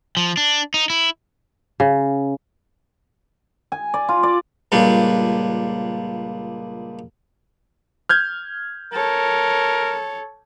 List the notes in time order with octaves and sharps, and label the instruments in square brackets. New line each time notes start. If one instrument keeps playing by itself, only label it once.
[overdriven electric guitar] F3
D4
D#4
E4
[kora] C#3
[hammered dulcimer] G#5
D5
F4
D5
[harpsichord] C#2 A#2 G3 D4
[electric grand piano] F6 G6 G#6
[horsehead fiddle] A4 C#5 [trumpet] A#4